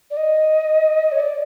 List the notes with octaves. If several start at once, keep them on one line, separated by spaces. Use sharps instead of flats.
D5
D#5
C#5
D5